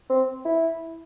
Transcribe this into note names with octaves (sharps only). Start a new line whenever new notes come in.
C4
E4